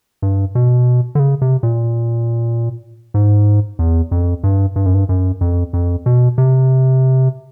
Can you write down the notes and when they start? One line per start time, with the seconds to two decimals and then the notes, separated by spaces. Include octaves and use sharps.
0.22 G2
0.55 B2
1.15 D3
1.19 C#3
1.42 C3
1.63 A#2
3.14 G#2
3.79 E2
4.11 F2
4.44 G2
4.76 G2
4.86 F#2
4.94 G2
5.09 F#2
5.41 F2
5.73 F2
6.06 B2
6.38 C3